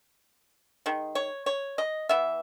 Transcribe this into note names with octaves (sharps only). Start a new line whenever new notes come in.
D#3 G#3
C#5
C#5
D#5
E3 B3 E5